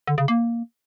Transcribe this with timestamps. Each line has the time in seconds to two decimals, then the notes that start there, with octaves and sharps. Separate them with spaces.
0.07 D3
0.18 C#3
0.28 A#3